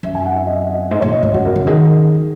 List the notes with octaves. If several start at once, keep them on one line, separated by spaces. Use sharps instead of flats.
F#2 E5
G#5
F#5
E5
D#5
D#5
G#2 D#5
A#2 C#5
D#5
G#2 C#5
F#2 F#4
E2 A#4
C#3 A#4
D#3 G#4
D#3